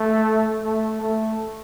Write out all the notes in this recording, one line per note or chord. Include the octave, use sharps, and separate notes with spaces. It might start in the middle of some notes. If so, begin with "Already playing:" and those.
Already playing: A3
A3
A3